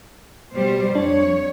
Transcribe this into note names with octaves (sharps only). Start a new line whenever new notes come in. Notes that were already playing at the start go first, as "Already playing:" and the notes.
B2 G3 C5
F2 D4 C#5